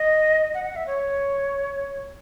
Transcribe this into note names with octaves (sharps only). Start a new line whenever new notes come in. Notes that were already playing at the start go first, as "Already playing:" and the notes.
Already playing: D#5
F#5
F#5
E5
C#5